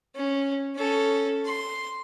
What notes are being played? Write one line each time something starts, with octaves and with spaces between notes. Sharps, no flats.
C#4
C#4 A4
C6